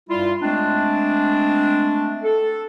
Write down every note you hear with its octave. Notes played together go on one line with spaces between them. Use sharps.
G2 G3 E4 F4
G#3 A3 C4 D4
A4